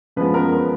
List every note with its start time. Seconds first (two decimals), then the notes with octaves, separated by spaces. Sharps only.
0.16 F#2 F3 G#3 B3 B4
0.34 A#4
0.52 A#4